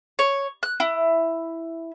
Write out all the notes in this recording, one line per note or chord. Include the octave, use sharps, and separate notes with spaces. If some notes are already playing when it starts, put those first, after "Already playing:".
C#5
F#6
E4